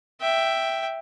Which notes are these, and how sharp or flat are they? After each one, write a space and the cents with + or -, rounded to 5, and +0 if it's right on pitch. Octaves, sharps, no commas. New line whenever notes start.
E5 +5 G5 +0